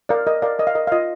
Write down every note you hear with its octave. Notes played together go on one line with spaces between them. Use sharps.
A#4 D5 F5
A#4 D#5
A#4 D5 F5
A#4 D#5
F5
A#4 D#5
F5
F4 D#5